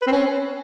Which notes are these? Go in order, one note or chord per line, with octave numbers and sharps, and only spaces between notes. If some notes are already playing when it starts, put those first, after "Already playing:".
B4
C4
C#4